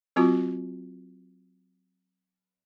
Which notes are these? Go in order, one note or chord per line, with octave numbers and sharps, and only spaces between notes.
F#3 C4 F4 F#4